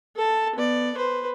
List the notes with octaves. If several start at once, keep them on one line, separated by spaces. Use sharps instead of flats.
A4 A5
B3 D5
B4 C5